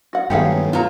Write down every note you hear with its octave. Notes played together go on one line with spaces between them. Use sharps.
F#4 F#5
G2 D#3 F#3 A3 B3 G4 G#4 F5
F4 A#5